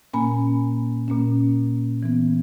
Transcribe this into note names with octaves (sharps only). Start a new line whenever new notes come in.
A#2 A#3 C#4 G#5 B5
A#2 A#3 C#4
E3 B3